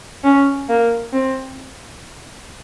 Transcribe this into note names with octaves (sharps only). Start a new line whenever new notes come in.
C#4
A#3
C4